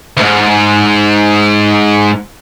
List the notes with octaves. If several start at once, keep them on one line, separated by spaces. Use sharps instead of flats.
D2 G#2